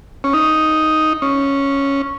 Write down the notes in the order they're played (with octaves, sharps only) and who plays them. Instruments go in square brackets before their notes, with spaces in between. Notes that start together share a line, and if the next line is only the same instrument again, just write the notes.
[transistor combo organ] C#4
D#4
C#4